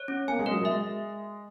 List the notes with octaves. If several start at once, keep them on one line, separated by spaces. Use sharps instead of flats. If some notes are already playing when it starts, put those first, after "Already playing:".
Already playing: C#5
C#4
A#3 G#5
G#3
F#3 A#4
G#3 E5